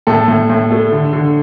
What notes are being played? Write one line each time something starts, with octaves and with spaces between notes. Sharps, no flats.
A2 A4
A2
A2
A3
D3
D3